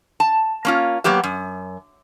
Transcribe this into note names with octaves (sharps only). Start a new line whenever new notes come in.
A5
A#3 C#4 F4
F#3 A#3 B3 G4 E5
F#2